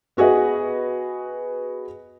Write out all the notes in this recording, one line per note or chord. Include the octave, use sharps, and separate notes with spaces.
B3 F#4 G#4 B4 D#5